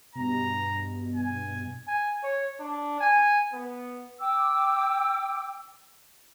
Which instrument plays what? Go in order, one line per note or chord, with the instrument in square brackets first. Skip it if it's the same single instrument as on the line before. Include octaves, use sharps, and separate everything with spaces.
[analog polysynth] G2 B2 [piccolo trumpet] A#5
[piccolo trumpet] G#5
[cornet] G#5
C#5
D4
G#5
B3
[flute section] G5 D6 E6